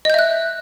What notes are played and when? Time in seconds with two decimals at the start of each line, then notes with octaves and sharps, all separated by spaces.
0.05 D#5
0.10 G6
0.14 E5
0.19 F#6